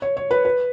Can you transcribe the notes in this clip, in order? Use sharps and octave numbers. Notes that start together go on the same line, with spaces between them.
C#5
C#5
B4
B4